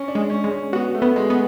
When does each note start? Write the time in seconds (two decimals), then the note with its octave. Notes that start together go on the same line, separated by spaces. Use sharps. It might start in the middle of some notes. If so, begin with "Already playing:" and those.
Already playing: C#4
0.08 D4
0.15 G#3
0.30 C#4
0.44 G#3
0.51 C#4
0.73 B3 F#4
0.95 A3
1.02 B3
1.16 G#3
1.30 B3